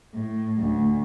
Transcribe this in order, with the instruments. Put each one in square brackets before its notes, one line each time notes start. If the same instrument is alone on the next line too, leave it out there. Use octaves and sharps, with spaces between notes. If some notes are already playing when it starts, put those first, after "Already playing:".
[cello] A2
D2